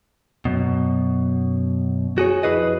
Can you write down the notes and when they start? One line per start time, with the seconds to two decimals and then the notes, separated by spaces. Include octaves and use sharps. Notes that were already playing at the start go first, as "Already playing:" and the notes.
0.45 F#2 B2
2.18 F#4 G#4 C#5
2.43 F2 E4 G#4 B4 D#5